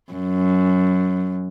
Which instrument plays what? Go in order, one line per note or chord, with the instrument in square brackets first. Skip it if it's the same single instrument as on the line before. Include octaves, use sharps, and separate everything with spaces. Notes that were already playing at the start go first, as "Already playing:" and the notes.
[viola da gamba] F#2